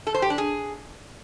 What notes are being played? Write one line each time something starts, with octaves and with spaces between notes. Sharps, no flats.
A4
C5
G4
D4
G#4